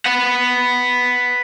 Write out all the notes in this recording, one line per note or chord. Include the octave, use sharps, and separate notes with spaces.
B4 F#5